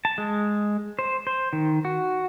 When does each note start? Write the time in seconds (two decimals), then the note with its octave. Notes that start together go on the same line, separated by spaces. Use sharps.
0.05 A5
0.18 G#3
0.99 C5
1.27 C5
1.53 D#3
1.85 F#4